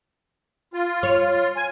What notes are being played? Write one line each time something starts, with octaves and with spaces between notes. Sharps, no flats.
F4
C#5
G#5